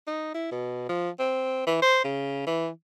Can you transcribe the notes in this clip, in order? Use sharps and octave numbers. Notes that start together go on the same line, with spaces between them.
D#4
E4
B2
F3
C4
E3
C5
C#3
E3